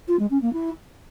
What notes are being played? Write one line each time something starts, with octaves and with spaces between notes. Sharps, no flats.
F4
G#3
C#4
A#3
E4